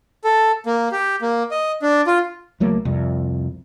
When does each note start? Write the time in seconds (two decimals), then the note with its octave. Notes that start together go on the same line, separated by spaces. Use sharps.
0.24 A4
0.66 A#3
0.92 G4
1.22 A#3
1.51 D#5
1.82 D4
2.07 F4
2.60 C#2 F#3 A3 A#3
2.85 C2 F2